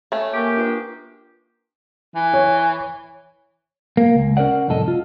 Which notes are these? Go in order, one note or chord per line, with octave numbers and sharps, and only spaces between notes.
A3 C#4
A#3 G4 G#5 C#6 D7
D4 F4 B4
E3
C#5
A#3
C#2
C#4 A#4 C5 D5 F#5
C2 F2 A2 A4 D#5
F4